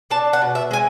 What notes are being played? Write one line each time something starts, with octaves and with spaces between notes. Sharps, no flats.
D4 A5
F#5
B2
E5
G#3 G#5